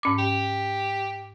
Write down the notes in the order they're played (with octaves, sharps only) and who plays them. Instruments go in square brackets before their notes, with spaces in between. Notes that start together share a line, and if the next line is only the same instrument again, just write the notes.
[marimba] G#2 C#4 D6
[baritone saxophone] G4